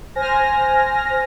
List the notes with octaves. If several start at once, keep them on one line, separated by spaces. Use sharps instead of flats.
C5 G#5 F6 A#6